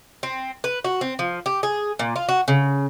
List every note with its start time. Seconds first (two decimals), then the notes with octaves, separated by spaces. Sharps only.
0.23 C4
0.64 B4
0.84 F#4
1.01 C4
1.19 F3
1.46 G4
1.63 G#4
1.99 A#2
2.16 F4
2.29 F#4
2.48 C#3